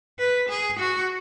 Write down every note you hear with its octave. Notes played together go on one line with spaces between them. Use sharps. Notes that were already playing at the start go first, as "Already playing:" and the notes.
B4
G#4
F#4